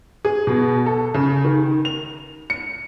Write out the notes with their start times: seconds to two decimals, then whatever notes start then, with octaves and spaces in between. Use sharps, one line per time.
0.25 G#4
0.47 B2
0.86 A4
1.14 C#3
1.45 D#3
1.85 F7
2.50 C#7